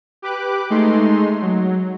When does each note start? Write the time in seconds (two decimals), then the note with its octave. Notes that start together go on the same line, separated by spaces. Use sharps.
0.22 G4 B4 D6 F#6
0.70 G#3 A3 D#4 C6
1.42 F#3